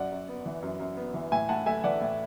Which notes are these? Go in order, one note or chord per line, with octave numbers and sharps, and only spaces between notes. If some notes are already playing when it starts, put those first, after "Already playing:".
Already playing: F#2 D5 F#5
F#2
B3
E3
F#2
F#2
B3
E3
A2 E5 G#5
A2 F#5 A5
A3 E5 G#5
E3 D5 F#5
A2